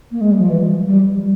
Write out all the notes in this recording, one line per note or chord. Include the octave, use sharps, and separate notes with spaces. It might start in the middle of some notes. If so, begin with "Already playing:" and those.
A#3
G#3
G3
F3
E3
F3
G3